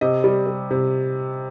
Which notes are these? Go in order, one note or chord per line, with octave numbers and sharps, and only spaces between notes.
C3 D#5
G3
G3
C3